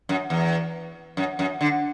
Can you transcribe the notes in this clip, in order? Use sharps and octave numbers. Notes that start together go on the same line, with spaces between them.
F#2
E2
F#2
F#2
D3